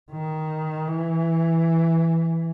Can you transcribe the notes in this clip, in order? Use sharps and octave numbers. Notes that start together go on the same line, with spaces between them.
D#3
E3